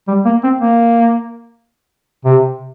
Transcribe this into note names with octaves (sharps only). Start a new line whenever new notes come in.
G3
A#3
C4
A#3
C3